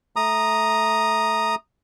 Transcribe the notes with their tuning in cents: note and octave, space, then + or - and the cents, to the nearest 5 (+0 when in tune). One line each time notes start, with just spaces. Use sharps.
A3 -10 A#5 +5 D#6 -10